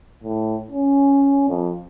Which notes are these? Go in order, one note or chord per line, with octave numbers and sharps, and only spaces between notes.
A2
C#4
F2